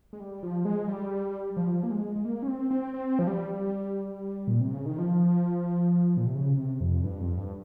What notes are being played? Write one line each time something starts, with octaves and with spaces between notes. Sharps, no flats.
G#3
G3
F3
G#3
G3
F3
A#3
G#3
G#3
A#3
C#4
C4
C4
C4
F3
G3
A#2
C3
C#3
D#3
F3
A#2
C3
C#3
C3
F2
G2
F2
G2